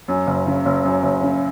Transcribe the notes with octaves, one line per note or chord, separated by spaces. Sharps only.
F#2
F#1
C#3
F#1
F#2
F#1
C#3